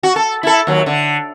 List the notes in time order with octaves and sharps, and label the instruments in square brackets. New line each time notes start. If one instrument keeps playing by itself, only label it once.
[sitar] F#4
A4
E4 A4
D#2 F#3
D3